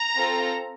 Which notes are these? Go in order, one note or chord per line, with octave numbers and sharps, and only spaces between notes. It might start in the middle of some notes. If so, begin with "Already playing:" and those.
Already playing: A#5
C4 F4 A4